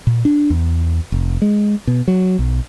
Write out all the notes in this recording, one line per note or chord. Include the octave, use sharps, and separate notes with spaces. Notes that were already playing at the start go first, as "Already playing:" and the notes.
A#2
D4
E2
F1
G#3
B2
F#3
B1